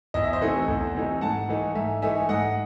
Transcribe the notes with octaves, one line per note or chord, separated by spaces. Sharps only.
E2 D#5
E5
C5 D#5
C3 E3 A3 D#4
E2
C3 E3 A3 D#4
G#2 F#5 A5
E3 A3 D#4
G#2 E5 G#5
E3 A3 D#4 E5 G#5
G#2 D#5 F#5